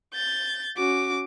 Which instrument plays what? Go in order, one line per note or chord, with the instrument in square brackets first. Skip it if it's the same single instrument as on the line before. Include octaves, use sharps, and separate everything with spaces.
[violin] G6 A6
[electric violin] C#4 F#4 [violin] D6